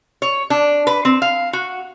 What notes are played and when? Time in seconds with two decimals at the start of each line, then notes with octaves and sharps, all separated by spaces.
0.22 C#5
0.50 D4
0.87 B4
1.05 C4
1.22 F5
1.53 F#4